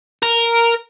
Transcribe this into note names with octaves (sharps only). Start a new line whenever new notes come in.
A#4